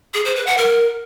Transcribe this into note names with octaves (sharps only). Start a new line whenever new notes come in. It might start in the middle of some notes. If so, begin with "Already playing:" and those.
G#4
C5
B4
F#5
A#4